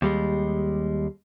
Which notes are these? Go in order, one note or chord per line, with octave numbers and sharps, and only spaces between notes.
D#2 G3 G#3